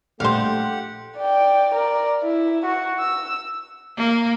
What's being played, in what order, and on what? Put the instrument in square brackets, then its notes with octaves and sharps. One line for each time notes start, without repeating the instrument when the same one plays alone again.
[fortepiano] A#1 G3 [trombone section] A3 [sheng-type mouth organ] G4 F#5 [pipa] C5 F5
[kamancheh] D5 G5
A#4 D5
E4
F#4
E6
[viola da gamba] A#3